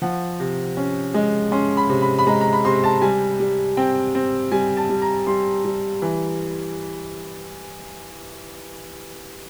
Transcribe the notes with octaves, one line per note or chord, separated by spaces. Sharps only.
F3 F#5
C3
C#4
G#3
C#4 C6
B5
C3
B5
B5
G#3 A#5
A#5
B5
C3 C6
A5
G3 G#5
G3
C4 G5
C4
G3 G#5
A5
G3
A#5
G3 C6
G3
E3